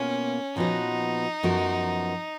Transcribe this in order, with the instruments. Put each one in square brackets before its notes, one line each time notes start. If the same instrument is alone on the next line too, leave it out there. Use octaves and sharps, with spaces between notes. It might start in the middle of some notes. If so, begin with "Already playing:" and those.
Already playing: [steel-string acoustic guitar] B2 A#3 F4 [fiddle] C#4
[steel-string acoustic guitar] A#2 F3 B3 F#4 B4 [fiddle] D#4
[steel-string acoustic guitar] F#2 F3 B3 F#4 A#4